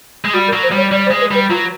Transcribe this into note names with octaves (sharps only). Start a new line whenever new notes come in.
G#3
G3 F#4
A#4
F#3
C5
G3
C#5
G3 D5
C5
G#3
B4
G3 B4
F#3 F4